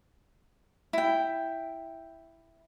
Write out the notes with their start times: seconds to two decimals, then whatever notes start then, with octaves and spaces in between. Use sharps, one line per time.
0.93 E4 G5